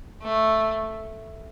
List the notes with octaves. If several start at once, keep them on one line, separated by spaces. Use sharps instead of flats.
A3